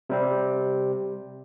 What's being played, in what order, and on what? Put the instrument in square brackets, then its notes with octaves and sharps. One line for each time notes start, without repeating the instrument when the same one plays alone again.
[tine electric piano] C3 G3 C4